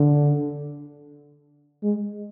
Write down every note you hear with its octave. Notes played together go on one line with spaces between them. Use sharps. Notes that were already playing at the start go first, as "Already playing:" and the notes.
Already playing: D3
G#3